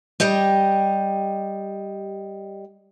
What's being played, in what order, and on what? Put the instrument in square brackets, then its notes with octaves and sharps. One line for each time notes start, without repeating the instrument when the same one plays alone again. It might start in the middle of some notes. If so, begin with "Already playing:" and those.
[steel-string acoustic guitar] G3 G4 D#5 G5